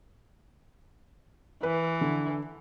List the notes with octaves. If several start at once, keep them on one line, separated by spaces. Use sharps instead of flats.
E3 B4
D3